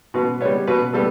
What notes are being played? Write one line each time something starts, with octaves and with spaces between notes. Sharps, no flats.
B2 B4
G3 B3 C#5
B2 B4
G3 B3 A4